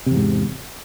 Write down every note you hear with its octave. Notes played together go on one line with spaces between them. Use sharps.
E2 G#2 C3